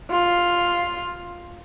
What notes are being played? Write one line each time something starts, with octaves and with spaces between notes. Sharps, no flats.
F4